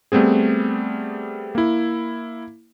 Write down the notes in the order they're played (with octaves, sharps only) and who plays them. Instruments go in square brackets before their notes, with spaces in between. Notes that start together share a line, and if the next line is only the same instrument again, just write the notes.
[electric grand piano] G3 A3 B3 C4 G#4
A#3 E4